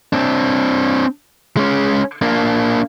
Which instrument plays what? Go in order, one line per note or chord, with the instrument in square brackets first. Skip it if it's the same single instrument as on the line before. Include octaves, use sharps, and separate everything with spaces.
[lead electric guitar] C4 D4
G#3 C#4
A#3 D4